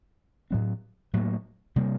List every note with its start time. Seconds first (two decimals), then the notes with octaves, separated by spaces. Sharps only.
0.51 A2 F#3 C4
1.13 A2 F#3 A#3
1.76 C3 G3 A#3